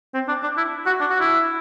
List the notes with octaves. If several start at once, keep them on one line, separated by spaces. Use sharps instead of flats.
C4
D4
D4
E4
F#4
D4
F#4
E4